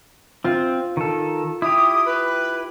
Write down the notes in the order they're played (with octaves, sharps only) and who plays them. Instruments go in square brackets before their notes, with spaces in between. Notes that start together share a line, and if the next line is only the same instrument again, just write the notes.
[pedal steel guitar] C4 [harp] F4
[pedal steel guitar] D#3 A4
[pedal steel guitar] E4 G4 [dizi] D#6
[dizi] B4